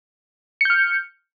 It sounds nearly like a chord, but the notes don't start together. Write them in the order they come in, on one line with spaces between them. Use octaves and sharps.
C#7 G6 F6